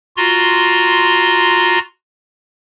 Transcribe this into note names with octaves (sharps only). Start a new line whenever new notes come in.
F4 F#4 A#5 C6